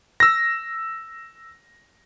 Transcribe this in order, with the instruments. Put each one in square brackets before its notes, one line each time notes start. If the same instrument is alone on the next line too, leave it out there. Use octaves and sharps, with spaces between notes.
[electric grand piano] E6 A#6